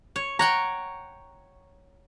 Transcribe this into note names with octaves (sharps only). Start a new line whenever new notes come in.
C#5
C#5 F#5 G5 A#5